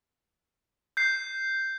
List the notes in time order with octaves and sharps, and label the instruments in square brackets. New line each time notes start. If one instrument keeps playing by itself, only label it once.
[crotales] G6 C7